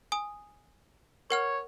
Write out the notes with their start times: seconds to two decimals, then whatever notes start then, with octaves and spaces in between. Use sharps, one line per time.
0.12 G#5 D#6
1.30 A#4 C#5 F#5 F6